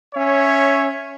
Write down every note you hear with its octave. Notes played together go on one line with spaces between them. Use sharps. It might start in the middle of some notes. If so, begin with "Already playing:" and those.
C#4 C#5 E5